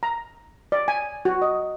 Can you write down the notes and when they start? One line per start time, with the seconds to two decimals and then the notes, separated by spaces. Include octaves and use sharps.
0.03 A#5
0.72 D5
0.88 G#5
1.25 F#4
1.42 D#5